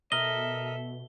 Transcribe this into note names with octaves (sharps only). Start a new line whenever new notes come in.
B2 A4 A#4 D#5 E5 G7